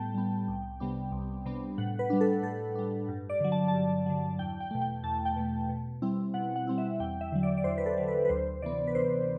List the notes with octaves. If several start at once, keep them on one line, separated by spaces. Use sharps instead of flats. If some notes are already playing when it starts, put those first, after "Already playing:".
Already playing: A2 G3 B3 G5 A5
G3 B3
C2
C3 G3 B3 D4
C2
C3 G3 B3 D4
A2 F#5
B4
G3 D4
A4
A2 A4
G3 D4
G2
D5
D3 F#3
A5
A5
G2
D3 F#3
E2 G5
G5
B2 A3
G5
E2 A5
G5
B2 A3
B2
G3 C4 E4
B2 F#5
F#5
G3 C4 E4
E5
E2 G5
E5
D3 F#3
D5
D5
E2 C5
B4
A4
D3 F#3
B4
B4
D2 C5
C3 E3 B3 D5
B4
D2 C5